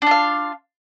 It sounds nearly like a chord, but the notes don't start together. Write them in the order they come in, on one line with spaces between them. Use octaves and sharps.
D4 F4 F5